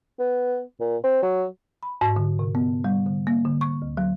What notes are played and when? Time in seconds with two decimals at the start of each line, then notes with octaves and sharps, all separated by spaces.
0.19 B3
0.80 A#2
1.03 C4
1.22 F#3
1.83 B5
2.01 G#2
2.16 D3
2.39 C3
2.55 B3
2.84 G3
3.06 D3
3.27 A#3
3.45 D3
3.61 C#6
3.82 D2
3.97 F#3